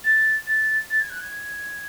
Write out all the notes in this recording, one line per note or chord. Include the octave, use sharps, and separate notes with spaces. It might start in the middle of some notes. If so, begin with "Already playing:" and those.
A6
A6
A6
G#6
F#6
G#6